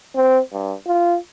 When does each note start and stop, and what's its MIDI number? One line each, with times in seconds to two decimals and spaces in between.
0.15 0.39 60
0.52 0.74 43
0.87 1.17 65